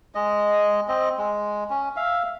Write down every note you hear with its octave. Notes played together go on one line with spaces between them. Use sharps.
G#3 D#5
C4 D#5
G#3
C#4
E5 F5